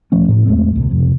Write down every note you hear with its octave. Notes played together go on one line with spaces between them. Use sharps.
D#1 F3 A3 C#4
A2
E2 G#3 A3 C4
C#2 A#2
F2 C3